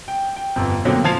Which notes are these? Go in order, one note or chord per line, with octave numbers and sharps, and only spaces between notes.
G5
G5
G1 F2
B2 D3 F#3 A#3 C4
F3 A5 G#6 C7 F7